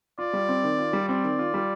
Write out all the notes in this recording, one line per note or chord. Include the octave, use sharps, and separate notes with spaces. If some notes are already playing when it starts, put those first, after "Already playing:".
F4 D5
G3
C4
D#3
F4
G3
C4 D5
D#3
F4
G3